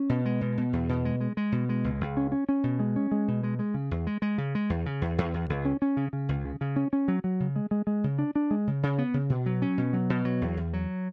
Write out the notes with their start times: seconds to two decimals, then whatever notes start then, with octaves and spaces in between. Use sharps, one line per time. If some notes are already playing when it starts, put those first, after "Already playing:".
Already playing: C#4
0.09 B2
0.25 G#3
0.41 B2
0.58 B2
0.73 E2
0.89 B2
1.05 G#3
1.20 G#3
1.37 G#3
1.52 B2
1.69 G#3
1.84 C#2
2.01 C#2
2.17 C#4
2.32 C#4
2.49 C#4
2.64 B2
2.79 G#3
2.96 C#4
3.11 G#3
3.28 B2
3.43 G#3
3.59 G#3
3.74 C#3
3.91 E2
4.07 G#3
4.22 G#3
4.38 C#3
4.55 G#3
4.70 E2
4.86 C#3
5.02 E2
5.18 E2
5.34 E2
5.50 C#2
5.65 C#4
5.82 C#4
5.97 C#3
6.13 C#3
6.29 C#2
6.45 C#3
6.61 C#3
6.76 C#4
6.93 C#4
7.08 F#3
7.24 F#3
7.40 C#3
7.56 G#3
7.71 G#3
7.87 G#3
8.04 C#3
8.19 D4
8.35 D4
8.51 G#3
8.67 C#3
8.83 C#3
8.98 B3
9.14 C#3
9.30 B2
9.46 F#3
9.62 C#4
9.78 B2
9.93 F#3
10.10 B2
10.25 F#3
10.41 E2
10.57 E2
10.73 F#3